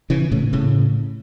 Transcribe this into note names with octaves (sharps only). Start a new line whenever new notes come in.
C#3 E3
A2 C#3
A2 C#3